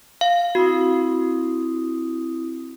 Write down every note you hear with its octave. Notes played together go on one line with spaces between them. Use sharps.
F5
C4 E4 F#4 D#6